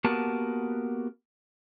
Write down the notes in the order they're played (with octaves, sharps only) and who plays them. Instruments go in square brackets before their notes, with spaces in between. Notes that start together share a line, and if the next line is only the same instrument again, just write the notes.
[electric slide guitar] A#3 B3 F#4 G4 A#4 A5